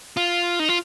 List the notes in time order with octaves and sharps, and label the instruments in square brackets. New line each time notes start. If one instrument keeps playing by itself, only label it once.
[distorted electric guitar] F4
D#4
F4